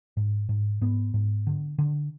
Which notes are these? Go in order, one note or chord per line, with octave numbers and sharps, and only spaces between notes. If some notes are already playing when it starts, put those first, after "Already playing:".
G#2
G#2
G#2 B3
G#2
D3
D3